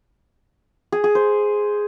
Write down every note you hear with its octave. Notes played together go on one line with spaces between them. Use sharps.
G#4
G#4
C5